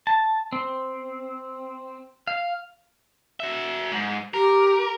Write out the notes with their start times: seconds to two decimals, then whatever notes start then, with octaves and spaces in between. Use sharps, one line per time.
0.07 A5
0.53 C4
2.27 F5
3.40 F#4 E5
3.92 G#2
4.34 G4 A#4